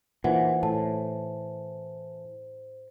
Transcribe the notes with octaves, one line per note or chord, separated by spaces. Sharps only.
A#2 E3 D#4 C5 F#5
A2 A5